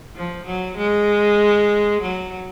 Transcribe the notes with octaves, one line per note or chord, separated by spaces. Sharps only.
F3
F#3
G#3
F#3